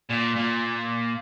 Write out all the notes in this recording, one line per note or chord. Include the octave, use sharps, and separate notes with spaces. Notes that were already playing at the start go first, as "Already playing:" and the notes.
A#2
A#2